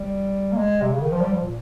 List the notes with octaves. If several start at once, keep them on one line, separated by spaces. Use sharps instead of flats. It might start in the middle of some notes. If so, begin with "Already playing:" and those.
Already playing: G3
A#3
G#3
C3
C#3
D#3
F3
G3
F3
A#2